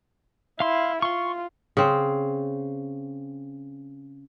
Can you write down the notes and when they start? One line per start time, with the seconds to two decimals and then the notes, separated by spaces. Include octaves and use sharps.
0.60 E4 F5 C6
1.02 F4 C6 C#6
1.77 C#3 C4